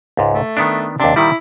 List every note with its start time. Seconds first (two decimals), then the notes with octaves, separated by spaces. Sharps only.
0.17 C#2 G#2
0.34 A3
0.57 D#3 B3 D4
1.00 D#2 C3 D4
1.16 A#2 D#3 G3 E4